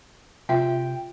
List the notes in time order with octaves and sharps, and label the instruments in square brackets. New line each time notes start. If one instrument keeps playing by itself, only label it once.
[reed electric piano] C3 G5 [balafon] F4 E5